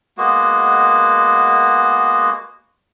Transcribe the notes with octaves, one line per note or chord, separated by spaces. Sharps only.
G#3 A#3 B3 F#4